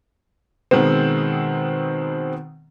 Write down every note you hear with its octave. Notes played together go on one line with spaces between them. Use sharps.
B2 D#3 G#3 B3 C4